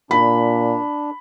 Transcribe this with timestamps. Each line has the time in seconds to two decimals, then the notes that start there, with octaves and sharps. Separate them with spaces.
0.11 A#2 D4 B5